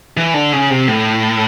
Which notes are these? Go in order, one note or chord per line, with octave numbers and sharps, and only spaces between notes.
E3
D3
C#3
C3
A2